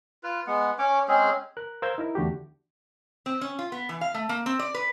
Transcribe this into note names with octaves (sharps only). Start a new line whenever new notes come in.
F4 B4
G#3 B3 F#5
C#4 C#5 D6
G#3 C4 C#4 G#4
A#4 F#6
A#4 C5 F5 E6 G6 G#6
D#4 E4 A#4
E2 D3 A3 F#4 G4
C4
C#4
F4
B3
E3
F5
A3
A#3
C4
D5
B4